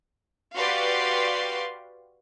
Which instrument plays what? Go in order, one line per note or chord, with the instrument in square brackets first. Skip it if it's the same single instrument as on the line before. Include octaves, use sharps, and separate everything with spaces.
[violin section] F#4 G4 B4 D5 F5 C6